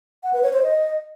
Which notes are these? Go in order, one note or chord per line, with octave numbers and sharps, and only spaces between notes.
F#5
B4
C#5
C5
D#5